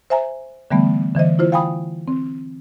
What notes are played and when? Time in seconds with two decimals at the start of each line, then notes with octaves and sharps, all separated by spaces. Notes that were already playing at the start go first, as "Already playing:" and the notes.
0.10 C5 E5 G#5 A#5
0.71 D3 E3 G3 A3 B3
1.15 D3 E3 C5 D#5
1.39 E4 F4 C5
1.52 F5 G5 G#5 B5 D#6
2.08 C4